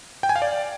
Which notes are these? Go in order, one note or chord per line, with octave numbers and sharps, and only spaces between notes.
G5
G#5
F5
D5